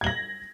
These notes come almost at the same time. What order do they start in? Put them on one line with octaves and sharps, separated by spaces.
G#6 F#7 A#6